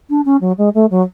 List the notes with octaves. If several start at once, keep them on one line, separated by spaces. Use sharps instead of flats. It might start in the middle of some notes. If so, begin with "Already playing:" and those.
D4
C#4
F#3
G#3
A3
F#3